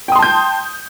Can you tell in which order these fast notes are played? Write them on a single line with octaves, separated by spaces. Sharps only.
G5 D#6 C6 A5 G6